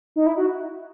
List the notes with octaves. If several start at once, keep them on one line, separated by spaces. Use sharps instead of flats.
D#4
E4
F#4